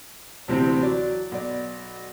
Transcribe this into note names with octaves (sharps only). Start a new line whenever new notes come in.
D2 C3 E3 C4
F#3 D5
B1 D5